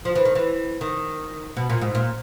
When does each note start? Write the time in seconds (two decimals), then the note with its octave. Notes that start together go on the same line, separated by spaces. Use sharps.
0.05 F3
0.15 E3
0.25 D#3
0.35 E3
0.81 D#3
1.57 B2
1.70 A#2
1.81 G#2
1.95 A#2